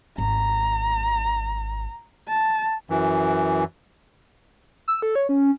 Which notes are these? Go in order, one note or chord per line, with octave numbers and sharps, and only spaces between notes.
G#1 A#5
A5
F#2 E3
E6
A4
C#5
C#4